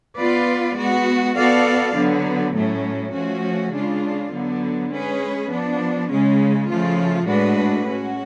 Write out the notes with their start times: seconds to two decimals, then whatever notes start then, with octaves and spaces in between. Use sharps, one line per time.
0.17 B3 F4 B4 D5
0.76 G#3 B3 F#4
1.35 B3 F#4 A4 D5 F5
1.94 D3 F#3 B3
2.53 A2 F#3 A3 C#4
3.12 F3 A3 C#4 F#4
3.71 C#3 G#3 D4 F4
4.31 D3 F#3 B3
4.90 G#3 C#4 G#4 B4
5.49 F3 B3 D4
6.08 C#3 G#3 C#4
6.67 C#3 F3 A3 F4
7.26 A2 G#3 D4 F#4 B4
7.86 G#3 C#4 F#4